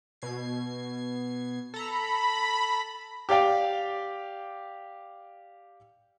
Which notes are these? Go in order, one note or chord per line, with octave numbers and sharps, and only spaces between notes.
B2 G#6 C7
A4 A#5 B5
G4 D5 F5 G5